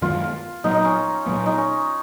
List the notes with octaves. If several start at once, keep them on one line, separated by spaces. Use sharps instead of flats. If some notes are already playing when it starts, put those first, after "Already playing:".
F#2 D#3 G#3 B3 F4
A#2 F#3 B3 D#4
D#4
C#4
A#2 F#3 B3
D#4
C#4